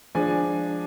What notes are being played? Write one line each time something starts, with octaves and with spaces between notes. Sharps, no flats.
F3 G#3 D4 G#5